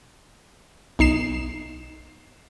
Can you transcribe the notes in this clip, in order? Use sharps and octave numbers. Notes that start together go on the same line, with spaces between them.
B1 D#4 C7 E7